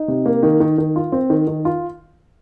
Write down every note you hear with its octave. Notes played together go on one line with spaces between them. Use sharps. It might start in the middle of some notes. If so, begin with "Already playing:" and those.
Already playing: D#4
C3
A#3
D#3
D#3
D#3
F4
C4
D#3
D#3
F4